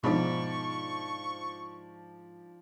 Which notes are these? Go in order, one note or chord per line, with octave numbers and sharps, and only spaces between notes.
G#2 B2 F3 D4 B5 C#6